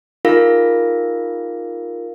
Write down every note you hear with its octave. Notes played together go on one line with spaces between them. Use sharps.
D#4 F4 G#4 A#4 F5 A#6